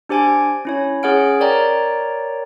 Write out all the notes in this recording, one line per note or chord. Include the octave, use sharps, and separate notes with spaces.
D4 G4 C5 G#5 G#6 D7
C#4 E4 C#5
C#4 G#4 C#5 F#5 F6 D7
A#4 C#5 D5 G5 A#5